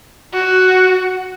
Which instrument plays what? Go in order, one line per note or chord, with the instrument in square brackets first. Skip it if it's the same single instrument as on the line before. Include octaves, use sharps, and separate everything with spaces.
[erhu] F#4